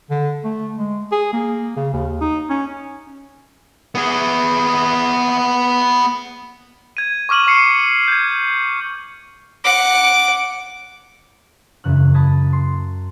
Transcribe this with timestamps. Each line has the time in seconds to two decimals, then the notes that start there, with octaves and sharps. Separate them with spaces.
0.11 D3
0.44 A3
0.77 G#3
1.12 G#4
1.33 A#3
1.76 C#3
1.93 D#2
2.21 D#4
2.50 C#4
3.95 B3 G#4
6.97 G#6 D#7
7.29 C#6 D6 F6 D#7 F#7
7.47 C#6 C7 C#7
8.08 G6 G#6
9.64 F#5 D6
11.84 E1 F#2 C#3 F#6
12.14 A5 B5 D#6 G#6 A#6
12.53 C6